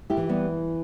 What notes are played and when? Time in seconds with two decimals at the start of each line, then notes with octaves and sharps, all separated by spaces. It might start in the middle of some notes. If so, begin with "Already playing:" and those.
0.10 E4 G4
0.17 E3
0.29 G3 B3